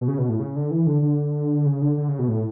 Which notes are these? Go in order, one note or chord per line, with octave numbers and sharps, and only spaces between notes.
B2
C#3
B2
A2
C#3
D3
E3
D3
D3
C#3
D3
D3
C#3
B2
A2